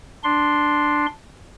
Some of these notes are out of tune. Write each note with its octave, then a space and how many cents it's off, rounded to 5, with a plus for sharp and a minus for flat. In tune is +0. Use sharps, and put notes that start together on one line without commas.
D4 +0 C6 +0